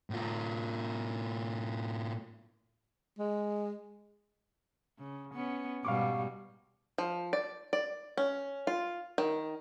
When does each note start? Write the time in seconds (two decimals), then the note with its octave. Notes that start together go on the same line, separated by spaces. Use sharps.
0.10 A2 F4
3.19 G#3
4.98 C#3
5.34 B3 C#4
5.85 G#2 B2 G3 F5 C#6 D6
6.98 F3
7.33 D5
7.73 D5
8.17 C#4
8.67 F4
9.18 D#3